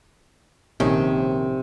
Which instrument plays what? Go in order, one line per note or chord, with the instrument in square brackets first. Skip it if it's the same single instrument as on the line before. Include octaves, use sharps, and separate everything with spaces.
[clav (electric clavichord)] A#1 D#3 C#4 [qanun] C3 C4 G5